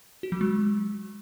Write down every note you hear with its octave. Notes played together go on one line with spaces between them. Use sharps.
F#4
F#3
G#3